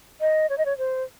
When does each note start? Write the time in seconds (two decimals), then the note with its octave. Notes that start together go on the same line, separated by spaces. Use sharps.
0.21 D#5
0.50 C#5
0.58 D#5
0.66 C#5
0.78 C5